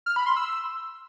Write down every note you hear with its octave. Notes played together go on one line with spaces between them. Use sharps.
F6
B5
C6
E6